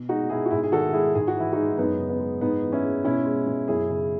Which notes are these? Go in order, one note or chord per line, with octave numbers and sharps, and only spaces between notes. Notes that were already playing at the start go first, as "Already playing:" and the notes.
Already playing: B2
G#3 D#4 F#4
B2 E4 G#4
F#4
G#2 E4 G#4
G#4
D#3 F#4 A4
G#3 E4 G#4
G#2 G#4
F#4
E3 E4
D#4 F#4
G#3
F#2 B3 D#4
C#3
B3
G#3
G#2 B3 D#4
E3
C#4 E4
G#3
B2 C#4 E4
G#3
B2
F#2 E4 G#4
C#3